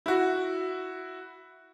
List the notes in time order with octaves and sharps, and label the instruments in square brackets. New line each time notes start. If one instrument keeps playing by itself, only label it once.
[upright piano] E4 F#4